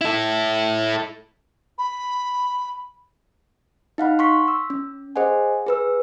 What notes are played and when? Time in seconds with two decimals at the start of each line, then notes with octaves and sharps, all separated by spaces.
0.01 E4 A4
1.78 B5
3.98 D#4 F5 F#5 B5
4.19 C6 C#6 B6
4.48 E6
4.70 C#4
5.16 G#4 C5 D#5 F#5 G#5
5.67 G#4 B4 E6